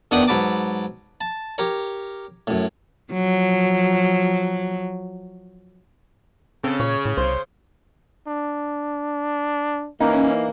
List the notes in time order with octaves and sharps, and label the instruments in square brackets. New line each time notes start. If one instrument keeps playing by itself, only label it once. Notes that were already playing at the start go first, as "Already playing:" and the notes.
[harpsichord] E2 D#3 D4 F#5 G5 D#6
G#2 F#3 B4 A5 D6
A5
G4 A#4 C#5
F#2 A2
[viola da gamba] F3 F#3
[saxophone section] C#3 [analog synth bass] C4 [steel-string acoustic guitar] A4
[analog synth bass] A#2 [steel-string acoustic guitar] C#5
[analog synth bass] A2
[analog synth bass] C2 [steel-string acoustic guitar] C5
[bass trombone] D4
[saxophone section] E3 A#3 [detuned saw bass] C#4 [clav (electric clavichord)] D#4